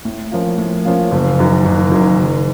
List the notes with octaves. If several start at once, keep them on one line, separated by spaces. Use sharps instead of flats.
A2
F3 A#3 C#4 F4
A2
F3 A#3 C#4 F4
F#1
F#2 D#3
F#1
F#2 D#3
F#1